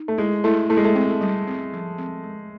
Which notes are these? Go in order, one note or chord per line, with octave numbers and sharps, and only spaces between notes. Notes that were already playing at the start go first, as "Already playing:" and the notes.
Already playing: D#4
A3
G#3 E4
A3 E4
A3 E4
G#3
A3
C4
G3
C4
F3
C4
G#3